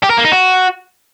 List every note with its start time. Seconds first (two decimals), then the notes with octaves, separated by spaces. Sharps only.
0.03 G4
0.10 A#4
0.17 A#3
0.25 D#4
0.32 F#4